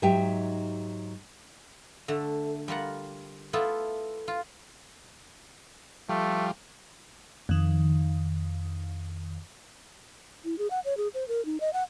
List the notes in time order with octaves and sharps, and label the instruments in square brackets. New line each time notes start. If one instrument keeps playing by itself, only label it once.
[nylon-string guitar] G#2 F#3 D#4 G4 E5 G5
[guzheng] D3 A3
G3 F4 A#4 F#5
A3 B3 E4 F4 A4
F4
[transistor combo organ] F3 G3 [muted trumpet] A3
[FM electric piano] F2 D#3
[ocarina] E4
G#4
F#5
C#5
G#4
C5
A#4
D#4
D#5
F#5